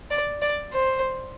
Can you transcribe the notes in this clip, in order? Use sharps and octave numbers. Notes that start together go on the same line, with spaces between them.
D5
D5
C5